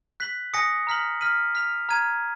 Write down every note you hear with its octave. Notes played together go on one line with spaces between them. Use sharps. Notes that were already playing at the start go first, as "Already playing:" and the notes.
F#6 B6 F#7
G#5 D#6 A#6 C#7
A#5 F6 B6 F#7
F6 B6 D#7 F#7
F6 B6 F7
A#5 F6 G#6 D#7